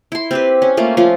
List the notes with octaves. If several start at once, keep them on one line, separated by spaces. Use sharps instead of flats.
E4 C6
C4 G4 B4
C#4
A3 A#3 F4
F3 A3 C#4 F4